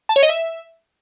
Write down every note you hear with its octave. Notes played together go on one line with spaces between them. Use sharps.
A5
C#5
D#5
E5